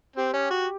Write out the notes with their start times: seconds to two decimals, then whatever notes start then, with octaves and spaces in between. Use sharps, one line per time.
0.16 C4 G4
0.34 C#4
0.51 F#4